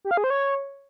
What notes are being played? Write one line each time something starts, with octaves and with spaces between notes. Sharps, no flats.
G4
F5
G#4
C5
C#5